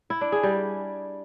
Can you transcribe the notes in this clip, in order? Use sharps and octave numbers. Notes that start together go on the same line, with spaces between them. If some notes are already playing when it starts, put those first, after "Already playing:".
E4
D4
G#4
G3